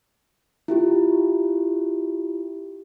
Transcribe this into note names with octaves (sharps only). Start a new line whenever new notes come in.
E4 F4 G4